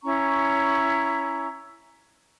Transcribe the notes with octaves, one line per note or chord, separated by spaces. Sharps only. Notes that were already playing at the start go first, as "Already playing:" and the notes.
C#4 E4 A#5 C#6